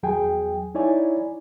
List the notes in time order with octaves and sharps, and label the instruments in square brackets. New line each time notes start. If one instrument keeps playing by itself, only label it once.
[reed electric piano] E2 F#3 G#4 G5 G#5
D#4 E4 C#5 D5 G#5